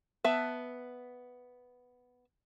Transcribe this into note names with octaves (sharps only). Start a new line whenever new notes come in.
B3 E5 A5